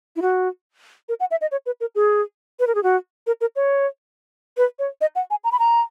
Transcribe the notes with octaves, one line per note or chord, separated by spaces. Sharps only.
E4
F#4
A#4
F#5
E5
D#5
C#5
B4
A#4
G#4
B4
A#4
G#4
F#4
A#4
A#4
C#5
B4
C#5
D#5
F#5
G#5
A#5
B5
A#5